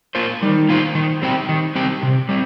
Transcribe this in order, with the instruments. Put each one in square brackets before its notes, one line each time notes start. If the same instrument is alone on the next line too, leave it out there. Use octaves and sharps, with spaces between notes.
[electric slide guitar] A#3 F4 C5
[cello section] D#3 [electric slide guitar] G3
[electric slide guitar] A#3 F4 C5
D#3
G3 C4 G4
D#3
G3 C4 G4
C3
G3 C4